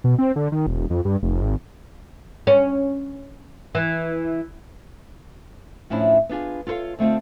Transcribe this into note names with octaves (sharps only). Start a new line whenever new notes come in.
B2
C4
D3
D#3
E1
F2
G2
F1
G#1
C#4
E3
A2 F3 C#4 D4 E4
B3 D4 F4 G#4
F4 A4 B4 C#5 F5
D3 A3 C4 D#4 F4